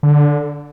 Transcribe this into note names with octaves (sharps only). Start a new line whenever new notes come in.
D3